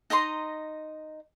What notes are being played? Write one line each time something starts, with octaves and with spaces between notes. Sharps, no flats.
D#4 D#5 A#5 C6